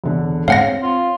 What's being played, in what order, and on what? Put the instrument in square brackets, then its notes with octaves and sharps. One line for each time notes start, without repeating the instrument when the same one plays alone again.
[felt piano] E1 D3
[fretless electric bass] G#2 C4 [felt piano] C#5 [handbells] F5 F#5 A#6
[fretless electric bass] C4
[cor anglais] F4